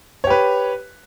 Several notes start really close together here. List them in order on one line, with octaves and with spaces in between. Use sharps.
C#5 G4 B4